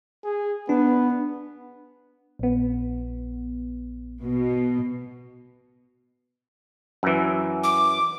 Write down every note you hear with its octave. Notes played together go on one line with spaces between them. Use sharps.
G#4
B3 D4
A#1 B3
B2
F#2 E3
D6